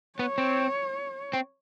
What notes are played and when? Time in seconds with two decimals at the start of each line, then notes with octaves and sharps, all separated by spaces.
0.19 B3 C#5
0.38 C4
1.33 C4